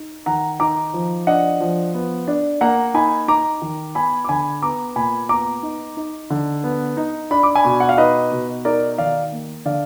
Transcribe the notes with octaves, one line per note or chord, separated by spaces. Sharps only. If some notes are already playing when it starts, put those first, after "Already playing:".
Already playing: D#4
D#3 F#5 A#5
D#4 A#5 D6
F3
D4 D#5 F#5
F3
B3
D4
A#3 F#5 A#5
D#4 G#5 B5
D#4 A#5 D6
D#3
B3 G#5 B5
D6
D3 G#5 B5
B3 A#5 D6
A#2 G#5 B5
B3 A#5 D6
D#4
D#4
D3
B3
D#4
D4 B5
D6
G#5 B5
B2
F#5
F5
D#4 B4 D#5
B2
D#4 A#4 D5
D#3 D5 F5
A#3
D3 D5 F5